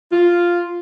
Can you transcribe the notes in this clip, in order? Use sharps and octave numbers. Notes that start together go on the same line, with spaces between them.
F4